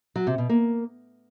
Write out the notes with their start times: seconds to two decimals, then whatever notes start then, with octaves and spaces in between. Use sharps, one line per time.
0.16 F#3
0.27 C3
0.38 B2
0.49 A#3